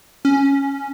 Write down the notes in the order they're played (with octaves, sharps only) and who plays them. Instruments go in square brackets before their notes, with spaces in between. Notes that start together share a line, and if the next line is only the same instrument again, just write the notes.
[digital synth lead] C#4